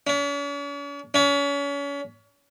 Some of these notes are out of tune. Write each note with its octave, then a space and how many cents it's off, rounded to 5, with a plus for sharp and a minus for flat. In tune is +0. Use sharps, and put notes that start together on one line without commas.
C#4 +45
C#4 +35